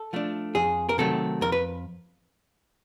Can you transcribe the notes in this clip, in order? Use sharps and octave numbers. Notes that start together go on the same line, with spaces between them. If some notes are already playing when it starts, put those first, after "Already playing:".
Already playing: A4
F3 A3 D4
F2 G#4
A#4
C3 D#3 F#3 A3 A4
F2 A#4
B4